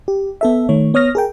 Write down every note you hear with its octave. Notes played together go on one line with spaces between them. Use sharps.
G4
B3 A4 E5
D#3 A3 C#5
B3 C#5 D#6 F6 A#6
G#4 A#4 G5